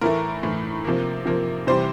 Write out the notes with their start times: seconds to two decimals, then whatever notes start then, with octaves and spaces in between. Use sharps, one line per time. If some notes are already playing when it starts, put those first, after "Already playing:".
0.01 A2 E3 A3 A#4
0.43 A2 E3 A3
0.84 C3 F3 A#3
1.25 C3 F3 A#3
1.67 C3 E3 G3 C5